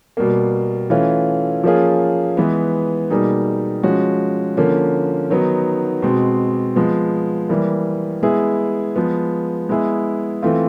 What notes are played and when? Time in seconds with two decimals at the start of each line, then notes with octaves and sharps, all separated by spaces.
0.17 B2 G3 A#3
0.90 E3 A3 C#4 F4
1.64 F3 A#3 C#4 F4 G#4
2.37 E3 G#3 B3
3.10 B2 G3 A#3 D#4 G#4
3.83 F3 G#3 C#4 F#4
4.57 D3 F3 A#3 C#4
5.30 D#3 F#3 B3 D#4
6.02 B2 G#3 C4
6.76 F3 G#3 B3
7.49 E3 G3 A#3
8.23 G#3 B3 E4 G#4
8.96 F3 G#3 B3
9.69 G#3 B3 E4 G#4
10.42 E3 A3 C4 F4